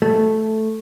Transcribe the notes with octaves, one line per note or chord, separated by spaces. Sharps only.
A3